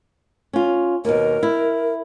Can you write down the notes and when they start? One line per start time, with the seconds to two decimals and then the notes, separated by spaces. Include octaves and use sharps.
0.53 C#4 F4
1.05 D#2 B2 A#4
1.43 E4